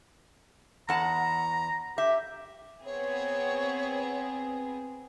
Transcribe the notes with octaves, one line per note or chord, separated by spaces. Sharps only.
E2 F#5 A5 A#5
G4 E5
B3 C4 G#4 C#5